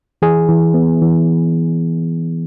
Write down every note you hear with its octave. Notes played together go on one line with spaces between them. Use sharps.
E3 G#4
E3
B3
E3